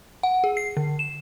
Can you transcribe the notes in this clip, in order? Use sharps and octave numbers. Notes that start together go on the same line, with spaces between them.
F#5
G#4
C7
D3
E7